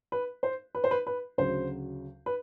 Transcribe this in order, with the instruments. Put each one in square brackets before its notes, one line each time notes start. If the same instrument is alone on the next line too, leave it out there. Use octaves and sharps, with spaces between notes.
[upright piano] B4
C5
B4
C5
B4
B4
D2 C#3 F#3 C5
B4